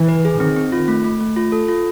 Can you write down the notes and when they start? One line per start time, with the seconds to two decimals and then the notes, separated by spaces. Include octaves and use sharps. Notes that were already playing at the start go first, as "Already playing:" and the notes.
Already playing: E3
0.08 B4
0.25 G#4
0.40 D#3 C4
0.56 C4
0.72 F4
0.88 A3
1.05 A3
1.20 A3
1.36 F4
1.52 A4
1.68 F4